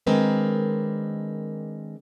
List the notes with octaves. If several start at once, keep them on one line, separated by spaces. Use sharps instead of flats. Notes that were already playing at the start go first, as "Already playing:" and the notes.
D#3 G#3 C4 D4 A#4 B4